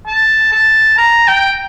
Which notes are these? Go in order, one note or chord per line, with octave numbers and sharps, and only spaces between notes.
A5
A5
A#5
G5